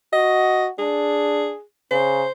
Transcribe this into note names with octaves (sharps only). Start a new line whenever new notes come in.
F#4 D#5
D4 G#4
C#3 C5